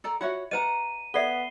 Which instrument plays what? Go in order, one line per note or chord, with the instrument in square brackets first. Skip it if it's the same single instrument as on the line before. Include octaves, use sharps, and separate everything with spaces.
[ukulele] A4 D5 A#5
[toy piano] F4 E5 [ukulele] F#4 C#5 F#5
[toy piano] B4 D#5 [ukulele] D5 F#5 A#5 [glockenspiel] D#7
[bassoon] B3 [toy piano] A4 D5 E5 [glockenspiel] C7 G7